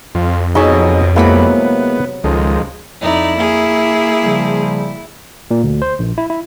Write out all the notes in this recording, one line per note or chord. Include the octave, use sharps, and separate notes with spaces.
F2 F4
B2 F#3 D#4 G#4 C#5 D#5 E5
C3 F#3 G#3 A#3 B3 E4 B5
C#2 D#3 F3 G#3 A4
F2 D#4 E4 D5
A#3 G#4
C#3 F3 G3
A#2
D2
C5
A#1
E4
E4